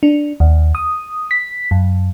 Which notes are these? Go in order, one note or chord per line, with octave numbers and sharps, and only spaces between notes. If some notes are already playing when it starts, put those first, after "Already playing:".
D4
D#2
D#6
B6
F#2